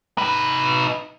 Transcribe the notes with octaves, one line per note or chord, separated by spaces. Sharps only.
D#4 B4